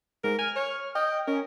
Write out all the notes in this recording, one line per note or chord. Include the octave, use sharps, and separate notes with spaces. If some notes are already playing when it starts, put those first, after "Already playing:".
G#2 A#4
G#5 F6
C#5
D#5 G5
C#4 A#4